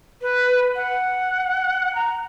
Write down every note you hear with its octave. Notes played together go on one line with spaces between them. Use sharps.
B4
F#5
A#5